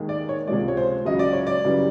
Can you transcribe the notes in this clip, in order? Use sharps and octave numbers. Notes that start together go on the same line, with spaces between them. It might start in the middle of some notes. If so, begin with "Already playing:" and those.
Already playing: D#2 D#3 G#3
D5
C#5
C#2 C3 F3 G#3 D5
C#5
C5
C#2 C#3 F#3 D#5
D5
C#5
D5
F#2 C#3 E3 G3